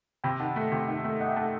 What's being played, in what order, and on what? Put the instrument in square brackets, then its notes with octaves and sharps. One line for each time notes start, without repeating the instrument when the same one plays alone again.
[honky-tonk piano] C3 [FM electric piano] G5 B5
[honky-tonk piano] D#3 [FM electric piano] F#5 A5
[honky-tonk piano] A3
C3
D#3
A3
[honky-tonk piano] D#4 [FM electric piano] D#5 F#5
[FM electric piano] E5 G5
[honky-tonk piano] A3 [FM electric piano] F#5 A5